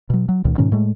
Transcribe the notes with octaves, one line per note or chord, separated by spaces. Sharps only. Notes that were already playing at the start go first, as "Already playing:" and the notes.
B2 F#3
F#3
C#2 A#2 D#3
G#2 B2 D#3 C#4
A2 G#3 A3